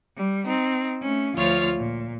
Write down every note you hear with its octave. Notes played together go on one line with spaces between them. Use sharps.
G3
C4 D#4
A3 C#4
D2 F3 F4 C#5 F6 A6
A#2